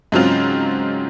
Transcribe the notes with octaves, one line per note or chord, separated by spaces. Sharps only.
G#2 C#3 F#3 C4 F4